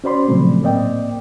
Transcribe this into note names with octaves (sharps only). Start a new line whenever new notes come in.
C#4 F#4 C5 D5 B5 C6
A#2 C#3 F3 F#3 A3 C4
A2 A#3 C4 D5 D#5 G5